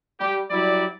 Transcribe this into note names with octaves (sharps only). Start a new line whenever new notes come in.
G3 G4
F#3 G3 E4 D5